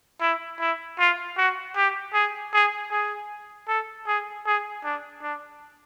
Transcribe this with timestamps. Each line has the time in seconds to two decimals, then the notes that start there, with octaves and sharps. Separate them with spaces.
0.21 E4
0.60 E4
0.99 F4
1.37 F#4
1.76 G4
2.13 G#4
2.53 G#4
2.91 G#4
3.68 A4
4.07 G#4
4.46 G#4
4.84 D4
5.23 D4